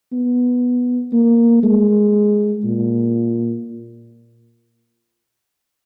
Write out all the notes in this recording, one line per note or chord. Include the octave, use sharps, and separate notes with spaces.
B3
A#3
G#3
A#2